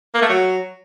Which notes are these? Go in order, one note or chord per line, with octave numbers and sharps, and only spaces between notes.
A#3
A3
F#3